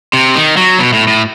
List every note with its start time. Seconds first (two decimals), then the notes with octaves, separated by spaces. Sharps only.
0.13 C3
0.36 D#3
0.57 F#3
0.79 B2
0.93 A2
1.08 A2